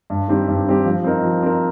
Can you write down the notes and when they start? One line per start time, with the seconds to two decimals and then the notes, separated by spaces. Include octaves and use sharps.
0.10 G2
0.28 D#3 G3 C4 G4
0.48 G2
0.67 D#3 G3 C4 G4
0.85 F3
1.04 C4 D#4 A#4
1.23 F3
1.43 C4 D#4 A#4